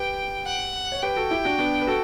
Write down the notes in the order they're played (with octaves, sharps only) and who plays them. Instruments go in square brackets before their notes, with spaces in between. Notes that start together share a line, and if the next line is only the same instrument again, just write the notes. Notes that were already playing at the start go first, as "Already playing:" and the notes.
Already playing: [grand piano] G4 B4 [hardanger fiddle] G5
[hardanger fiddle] F#5
[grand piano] C#5
[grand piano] G4 B4 [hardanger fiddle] G5
[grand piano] F#4 A4
E4 G4
D4 F#4
B3 D4
B4
F#4 A4